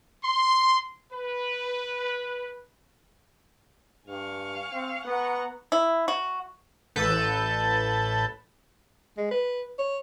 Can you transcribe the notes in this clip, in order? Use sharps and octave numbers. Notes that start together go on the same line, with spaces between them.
C6
B4
G2 F5 G#5 C#6
C4
B3 F#5 A#5 C#6
E4
F#4
A1 A4 B4 A5 G6
G#3
B4
C#5